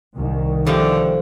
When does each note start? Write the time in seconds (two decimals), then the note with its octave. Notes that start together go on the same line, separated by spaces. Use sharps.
0.17 C2 D#3
0.66 D3 F3 A3 G4